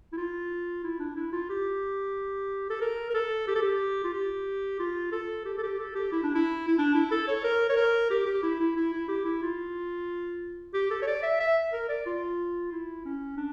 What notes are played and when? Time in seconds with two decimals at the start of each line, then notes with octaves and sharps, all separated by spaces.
0.13 E4
0.18 F4
0.84 E4
0.99 D4
1.16 E4
1.32 F4
1.49 G4
2.70 A4
2.81 A#4
3.10 A#4
3.14 A4
3.48 G4
3.55 A4
3.62 G4
4.04 F4
4.13 G4
4.79 F4
5.12 A4
5.45 G4
5.58 A4
5.63 G4
5.79 A4
5.95 G4
6.12 E4
6.23 D4
6.35 E4
6.68 E4
6.78 D4
6.94 E4
7.11 A4
7.28 C#5
7.44 A#4
7.69 C#5
7.76 A#4
8.10 G4
8.26 G4
8.43 E4
8.60 E4
8.76 E4
8.93 E4
9.08 G4
9.25 E4
9.42 F4
10.74 G4
10.91 A4
11.02 C#5
11.07 D5
11.23 E5
11.40 E5
11.73 A#4
11.89 D5
12.06 F4
12.72 E4
13.05 C#4
13.37 D4